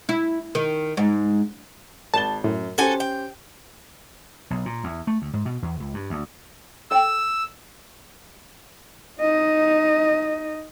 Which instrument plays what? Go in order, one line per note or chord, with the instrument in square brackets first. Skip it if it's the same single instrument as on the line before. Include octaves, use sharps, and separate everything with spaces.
[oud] E4
D#3
G#2
[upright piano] G#1 G7 [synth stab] A5
[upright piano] F#2 [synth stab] A2
[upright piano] C#4 G4 C5 [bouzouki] F#4 A4 G#5
[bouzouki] G5
[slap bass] B1
A#2
E2
A3
D2
G#2
B2
E2
C#2
G2
D2
[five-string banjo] A4 G5 [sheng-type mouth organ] E6
[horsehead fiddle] D#4 D#5